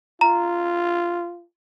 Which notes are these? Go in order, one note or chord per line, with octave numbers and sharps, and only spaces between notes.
F4 A#5